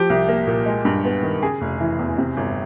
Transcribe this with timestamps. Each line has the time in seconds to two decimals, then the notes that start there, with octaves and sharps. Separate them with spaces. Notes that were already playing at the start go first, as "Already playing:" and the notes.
Already playing: F3 G4
0.10 C2
0.28 A#3
0.47 A#2
0.66 G#3
0.85 G2
1.04 B3
1.23 D#3
1.42 C#3 G#4
1.61 F1
1.80 E3
1.99 E2
2.18 C3
2.37 G1